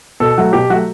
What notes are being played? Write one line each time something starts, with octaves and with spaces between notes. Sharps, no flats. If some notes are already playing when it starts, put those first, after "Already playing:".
B2 A4
F#3 A3 F#4
B2 G4
F#3 A3 F#4